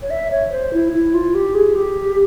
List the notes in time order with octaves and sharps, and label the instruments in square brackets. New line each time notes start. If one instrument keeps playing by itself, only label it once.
[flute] C#5
E5
C#5
C5
E4
E4
F4
G4
G#4
G4